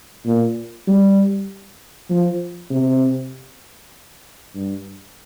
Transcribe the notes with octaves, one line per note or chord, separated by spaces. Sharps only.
A#2
G3
F3
C3
G2